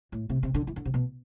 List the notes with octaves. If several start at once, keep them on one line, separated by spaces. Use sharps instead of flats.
A2
C3
C3
D3
E3
D3
C3
B2